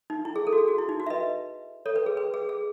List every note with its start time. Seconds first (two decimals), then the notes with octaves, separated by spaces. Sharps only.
0.10 D#4
0.25 E4
0.36 G#4
0.47 A4
0.53 F#4
0.58 G#4
0.68 F#4
0.78 E4
0.89 D#4
1.00 F#4
1.07 E5
1.10 B4 D#5
1.86 A4 C#5
1.96 B4
2.06 G#4
2.17 B4
2.34 G#4
2.49 G#4